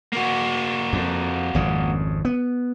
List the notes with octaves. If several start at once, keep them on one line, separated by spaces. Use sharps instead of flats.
A#3 F#4
F2
G#1 F2 C#3
B3